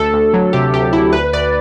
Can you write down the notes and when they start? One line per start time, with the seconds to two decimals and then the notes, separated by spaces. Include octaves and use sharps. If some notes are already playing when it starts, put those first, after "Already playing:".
Already playing: D2 A4
0.13 D2
0.34 F#3
0.53 C3 G4
0.73 D2 G4
0.93 D2 E4
1.13 D2 B4
1.33 D2 D5